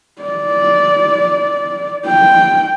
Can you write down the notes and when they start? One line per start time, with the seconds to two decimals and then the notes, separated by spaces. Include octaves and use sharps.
0.22 D5
2.06 G5